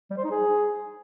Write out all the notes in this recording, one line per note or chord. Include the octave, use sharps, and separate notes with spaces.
G3
C5
D#4
G#4